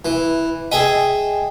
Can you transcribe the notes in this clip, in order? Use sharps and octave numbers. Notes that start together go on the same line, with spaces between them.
E3
G#4 D#5 E5 G5 G#5